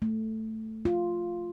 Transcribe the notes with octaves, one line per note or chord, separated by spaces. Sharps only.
A3
F4